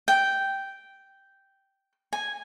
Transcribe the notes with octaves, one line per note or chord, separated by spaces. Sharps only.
G5
G#5